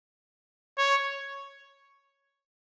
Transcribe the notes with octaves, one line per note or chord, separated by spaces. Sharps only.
C#5